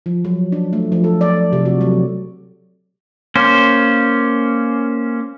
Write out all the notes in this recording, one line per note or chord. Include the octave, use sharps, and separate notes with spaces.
F3
F#3
D4
A3
F3
A4
D5
C3
F#4
F#3
A#3 C#4 C5